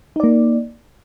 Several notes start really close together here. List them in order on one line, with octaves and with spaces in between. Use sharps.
D#4 D5 A#3